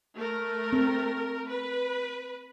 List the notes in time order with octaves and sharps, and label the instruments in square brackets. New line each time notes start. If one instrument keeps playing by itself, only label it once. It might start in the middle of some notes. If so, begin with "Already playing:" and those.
[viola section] A3 A#4
[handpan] C4
[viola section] B4